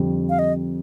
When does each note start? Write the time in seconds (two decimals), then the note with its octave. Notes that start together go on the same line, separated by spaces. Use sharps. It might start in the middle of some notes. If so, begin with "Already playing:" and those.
Already playing: F2 D3 G3 C4
0.29 F5
0.39 D#5